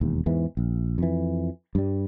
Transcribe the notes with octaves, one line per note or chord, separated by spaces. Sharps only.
E1 D#2
E2 G#2 E3
A#1
F2 E3
G2 G3